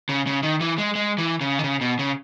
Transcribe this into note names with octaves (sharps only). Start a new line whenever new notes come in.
C#3
C#3
D#3
E3
G#3
G#3
E3
C#3
D#3
C#3
B2
C#3